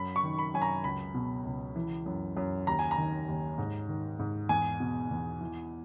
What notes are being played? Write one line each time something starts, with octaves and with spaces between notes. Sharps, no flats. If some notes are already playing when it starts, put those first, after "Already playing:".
Already playing: F#2 B5
C#6
D#3
B5
F#2 G#5
A#5
C#2 B5
B2
C#2
E3
F#2
F#2
D#2 A#5
G#5
A#5
D#3
D#2
G#2
D#3
G#2
E2 G#5
B2
E2
E3